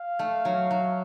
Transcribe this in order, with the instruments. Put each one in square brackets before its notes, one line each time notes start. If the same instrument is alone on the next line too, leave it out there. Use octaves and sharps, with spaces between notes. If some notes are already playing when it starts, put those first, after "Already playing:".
Already playing: [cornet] F5
[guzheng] A3
F#3
F#3